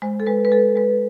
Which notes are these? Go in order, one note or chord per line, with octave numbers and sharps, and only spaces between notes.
G#3 C5
A4
G#3 B4
B4
G#3 A4
G#3 B4